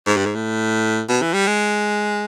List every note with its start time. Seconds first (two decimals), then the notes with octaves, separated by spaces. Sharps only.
0.07 G#2
0.17 G2
0.26 G#2
0.35 A2
1.09 B2
1.22 E3
1.34 G3
1.47 G#3